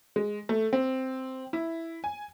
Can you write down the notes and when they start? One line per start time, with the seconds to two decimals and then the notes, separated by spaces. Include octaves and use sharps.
0.16 G#3
0.49 A3
0.73 C4
1.53 E4
2.04 G#5